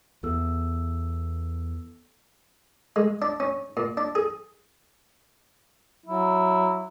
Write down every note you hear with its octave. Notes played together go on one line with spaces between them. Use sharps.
E2 B3 A4 E6
G#3
D4
C#4
A#2
D4
G#4
F#3 E4